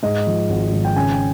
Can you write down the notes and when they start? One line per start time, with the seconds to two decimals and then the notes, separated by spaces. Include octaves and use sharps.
0.03 G#2 D#5
0.27 F3
0.50 G#1
0.73 G#1
0.85 G5
0.96 C#3 G#5
1.12 G5